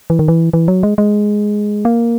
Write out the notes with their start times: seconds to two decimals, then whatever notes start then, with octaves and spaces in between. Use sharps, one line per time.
0.10 E3
0.19 D#3
0.28 E3
0.53 E3
0.68 F#3
0.83 G#3
0.98 G#3
1.85 A#3